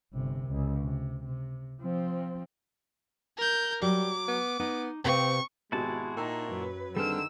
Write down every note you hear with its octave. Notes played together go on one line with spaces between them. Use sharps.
G1 C3
C#2
C3
C3
F3 C4
A#4 G6
F#3 G3 D6
B3
B3 D#4
C3 C4 B4 F5 C#6
G#1 B2 G#3 E4 F#4 G4 A5
A#2 D#4 G5 C#6 E6
F#2 F#3 B4
D3 D#3 G3 C4 G#4 B4 E6 F6